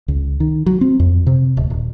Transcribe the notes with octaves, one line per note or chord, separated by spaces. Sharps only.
C#2
D#3
F#3
C4
F2
C3
D1
D#1